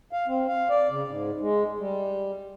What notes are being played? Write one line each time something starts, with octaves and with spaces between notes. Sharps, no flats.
F5
C4
F5
D5
C#3
G#2
G#3
G3